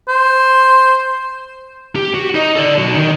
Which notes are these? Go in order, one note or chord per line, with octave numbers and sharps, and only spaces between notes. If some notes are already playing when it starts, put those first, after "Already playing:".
C5
G4
F#4
D#4 D#5
A4 D5
B1 F#4
D#3 D#4